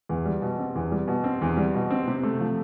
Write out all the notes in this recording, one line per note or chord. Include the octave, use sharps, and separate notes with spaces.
E2
G3
B2
C4
E2
G3
B2
C4
E2
G3
B2
C4
C3
A3
F3